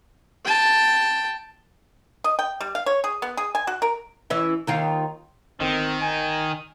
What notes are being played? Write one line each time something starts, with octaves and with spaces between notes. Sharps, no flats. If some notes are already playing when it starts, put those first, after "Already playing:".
G5 A5
D#5
G5
G3
F5
C#5
G#4
B3
G#4
G#5
F#4
A#4
E3 C#4 E4
D#2 D#3 F4
G1 D#3 C4
G#5